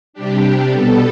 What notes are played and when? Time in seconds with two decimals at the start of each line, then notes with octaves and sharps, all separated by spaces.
0.13 C3 G3 D4 G4
0.71 B2 G3 B3 A4